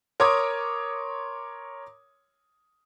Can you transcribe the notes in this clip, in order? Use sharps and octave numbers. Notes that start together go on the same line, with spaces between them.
A#4 C#5 C6 D6 D#6 G#6